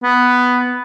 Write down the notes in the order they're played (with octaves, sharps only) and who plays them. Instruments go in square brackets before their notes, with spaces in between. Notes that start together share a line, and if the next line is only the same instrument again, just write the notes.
[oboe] B3